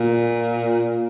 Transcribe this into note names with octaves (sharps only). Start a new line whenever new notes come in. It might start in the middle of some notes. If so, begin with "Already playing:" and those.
Already playing: A#2